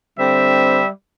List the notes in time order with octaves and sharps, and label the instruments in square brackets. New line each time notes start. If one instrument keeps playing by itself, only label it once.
[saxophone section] D3 C4 [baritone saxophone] G3 [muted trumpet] E5